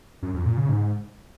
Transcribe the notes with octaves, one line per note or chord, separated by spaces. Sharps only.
F#2
F2
A#2
C#3
G#2